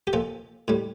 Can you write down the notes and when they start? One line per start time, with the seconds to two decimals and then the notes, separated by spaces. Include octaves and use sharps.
0.07 G4
0.13 A#2 F3 A4
0.68 A2 G3